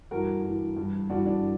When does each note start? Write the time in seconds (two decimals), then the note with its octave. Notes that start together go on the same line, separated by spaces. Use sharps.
0.11 G2 E3 F#4 A#4
0.44 G2 E3
0.77 G2 E3
1.10 G2 E3 D4 F#4
1.26 D4